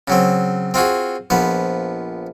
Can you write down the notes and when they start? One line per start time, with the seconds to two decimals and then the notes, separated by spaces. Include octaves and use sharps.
0.08 C#3 F#3 C4
0.74 C4 F4 F#4 G#4
1.30 A#1 F3 B3